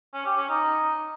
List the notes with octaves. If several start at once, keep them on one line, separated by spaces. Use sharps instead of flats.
C#4
G4
C#4
D#4